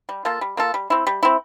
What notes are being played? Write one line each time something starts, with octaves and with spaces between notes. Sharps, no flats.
G3
A#3 F4 A4
G3
A#3 F4 A4
G3
C4 E4
G3
C4 E4